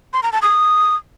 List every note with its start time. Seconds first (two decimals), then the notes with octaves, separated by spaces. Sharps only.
0.13 C6
0.23 A#5
0.33 A5
0.42 D#6